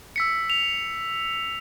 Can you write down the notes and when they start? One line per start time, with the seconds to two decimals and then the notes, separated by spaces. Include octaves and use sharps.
0.16 E6 B6 C#7
0.50 F7